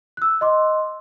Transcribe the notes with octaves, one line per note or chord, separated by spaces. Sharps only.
E6 F#6
D#5 C6 D6